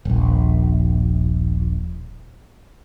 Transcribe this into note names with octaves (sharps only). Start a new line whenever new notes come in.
D#1 A#1